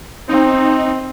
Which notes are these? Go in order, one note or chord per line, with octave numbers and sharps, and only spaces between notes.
C4 D#4